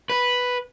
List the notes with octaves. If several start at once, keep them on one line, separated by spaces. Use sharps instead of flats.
B4